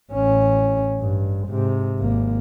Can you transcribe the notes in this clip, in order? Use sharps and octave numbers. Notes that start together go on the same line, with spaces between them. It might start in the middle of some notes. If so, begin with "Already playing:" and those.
A1 C#4
G2
G#2 C3
G#1 A#3